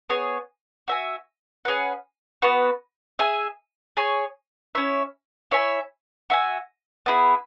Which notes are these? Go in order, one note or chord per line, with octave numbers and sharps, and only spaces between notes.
B3 G#4 C#5
F#4 E5 G#5
C#4 G#4 B4 F#5
B3 F#4 B4
G#4 E5 G#5
G#4 C#5 G#5
C#4 E4 C#5 E5
E4 C#5 E5 G#5
F#4 E5 G#5
B3 E4 G#4